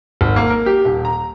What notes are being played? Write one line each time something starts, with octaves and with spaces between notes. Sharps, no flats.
G#1
A#3
A#4
G4
D#1
A#5